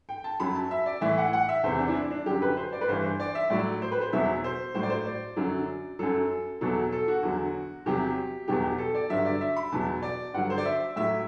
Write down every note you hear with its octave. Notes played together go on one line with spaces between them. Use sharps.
G5
A5
F#2 F#3 B5
A5
E5
D5
A2 E3 E5
F#5
F#5
E5
E2 C3 E3 C5
D4
E4
D4
D4
F#2 D3 F#3 G4
B4
C5
D5
B4
G2 E3 C5
C5
D5
E5
A2 F#3 D5
C5
B4
C5
E2 B2 F#3 E5
C5
A2 F#3 C5
D5
C5
D5
F#2 D3 F#3
F#2 F#3 A4
E2 B2 F#3 A4
A4
F#4
E2 D3 F#3
E2 C3 F#3 G4
E2 B2 F#3 G4
G4
A4
D5
G2 D3 F#3 E5
D5
E5
B5
E2 B2 F#3 A5
D5
G2 D3 F#3 F#5
C5
D5
E5
A2 F#3 E5